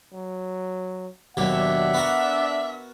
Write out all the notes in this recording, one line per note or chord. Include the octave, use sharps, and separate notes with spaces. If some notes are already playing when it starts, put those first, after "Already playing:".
F#3
D#2 B2 F#3 D4 E5 F#5
B3 F#4 A#4